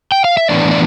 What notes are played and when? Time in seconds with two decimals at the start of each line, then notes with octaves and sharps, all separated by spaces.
0.12 G5
0.25 F5
0.37 E5
0.50 A2 E3 B3 D4 D5
0.71 D5